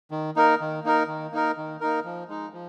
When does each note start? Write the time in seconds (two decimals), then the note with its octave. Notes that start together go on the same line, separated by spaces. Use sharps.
0.11 D#3
0.36 A#3 D#4 A#4
0.60 D#3
0.84 A#3 D#4 A#4
1.08 D#3
1.32 A#3 D#4 A#4
1.57 D#3
1.81 A#3 D#4 A#4
2.05 F3
2.29 G#3 D#4
2.54 F3